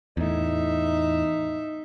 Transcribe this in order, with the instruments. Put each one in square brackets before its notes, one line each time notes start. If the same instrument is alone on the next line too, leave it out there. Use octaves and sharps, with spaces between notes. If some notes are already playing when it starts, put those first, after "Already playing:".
[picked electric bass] E2 A2 [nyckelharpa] D#4 E5